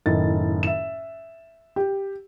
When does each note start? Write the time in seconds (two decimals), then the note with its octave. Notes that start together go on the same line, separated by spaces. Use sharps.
0.06 F#1 A2 D#3 A6
0.63 E5 E7
1.76 G4